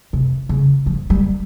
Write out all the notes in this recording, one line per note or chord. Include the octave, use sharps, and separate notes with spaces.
C3
C#3
F3
G3